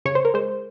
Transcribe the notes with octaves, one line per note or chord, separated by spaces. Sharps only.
C#3 C#5
C5
A#4
G#3 C5